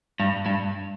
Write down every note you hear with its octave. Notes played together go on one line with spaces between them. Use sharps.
G2
G2